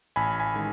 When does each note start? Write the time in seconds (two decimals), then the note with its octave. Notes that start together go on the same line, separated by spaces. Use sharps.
0.16 A1 G#5 B5
0.39 G#5 B5
0.54 D#3 G#3